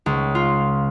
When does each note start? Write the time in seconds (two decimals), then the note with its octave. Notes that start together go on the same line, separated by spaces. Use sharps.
0.06 C#2
0.35 F4